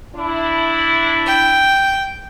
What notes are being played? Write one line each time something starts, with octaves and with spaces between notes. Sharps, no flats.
D4 E4
G5